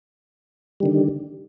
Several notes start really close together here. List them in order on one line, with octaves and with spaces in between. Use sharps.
G3 D#3 D3